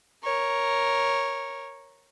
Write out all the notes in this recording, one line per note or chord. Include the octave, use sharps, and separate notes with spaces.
A#4 C#5